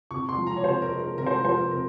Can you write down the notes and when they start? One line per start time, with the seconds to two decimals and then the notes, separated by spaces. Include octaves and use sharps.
0.11 C3 C#6
0.29 C6
0.37 F3
0.47 A#5
0.57 C#5
0.64 C3 C5
0.82 A#4
0.91 G#3
1.00 A#4
1.17 C3 A#4
1.26 C5
1.35 A#4
1.44 F3 C5
1.54 A#4
1.71 C3 A#4